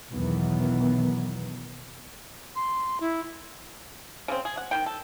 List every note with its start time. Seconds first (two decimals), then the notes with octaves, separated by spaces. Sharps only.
0.12 B1 E2 D#3 E3 F#3 B3
2.56 C6
3.00 E4
4.28 C#3 C4
4.45 G#4
4.57 F#5
4.71 D#3 B3 G5
4.86 A4